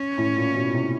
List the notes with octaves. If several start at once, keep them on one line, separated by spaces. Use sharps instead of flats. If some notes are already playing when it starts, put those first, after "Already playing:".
Already playing: C#4
A2
A#2
B2
C3